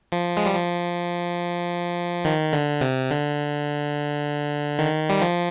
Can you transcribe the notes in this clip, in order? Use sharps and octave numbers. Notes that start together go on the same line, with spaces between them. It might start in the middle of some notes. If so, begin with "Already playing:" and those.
F3
G#3
G3
F3
D#3
D3
C3
D3
D#3
G3
F3